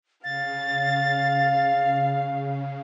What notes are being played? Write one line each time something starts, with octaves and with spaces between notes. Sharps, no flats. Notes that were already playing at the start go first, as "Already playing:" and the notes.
C#3 F5 A6